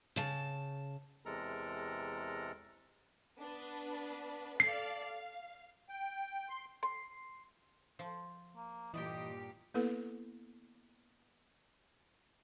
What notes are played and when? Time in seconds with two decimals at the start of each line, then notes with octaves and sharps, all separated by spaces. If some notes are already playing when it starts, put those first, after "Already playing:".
0.16 C#3 A5
1.26 E2 C3 G#3 A4 A#4 A#5
3.39 B3 D4 B4
4.60 A4 D5 F5 C7
5.02 F5
5.89 G5
6.49 C6
6.83 C6
7.99 F3
8.56 A#3
8.94 G2 A#2 E3 G3 G4 D#5 G5
9.74 A#3 B3 E4 A4 B4